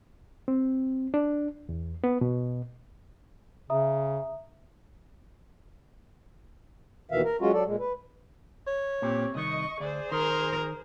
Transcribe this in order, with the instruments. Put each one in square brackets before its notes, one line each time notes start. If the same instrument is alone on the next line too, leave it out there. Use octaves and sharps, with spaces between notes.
[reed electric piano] C4
D4
E2
B3
B2
[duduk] C#3 [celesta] E5 A#5 D#6
[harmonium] D#2 B2 D#3 E3 E5 F5
A#4
F#3 G#3 C#4 F4 F#4
F#3 A4 D5
A#2 G#3
B4
[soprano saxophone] C#5
[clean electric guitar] A#2 [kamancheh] C4 G4
[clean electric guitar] C2 D#3 [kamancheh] D#5 C#6
[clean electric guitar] D2 [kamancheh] G#4 C5 [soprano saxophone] D5
[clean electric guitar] D#3 [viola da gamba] A#4 [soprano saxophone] C6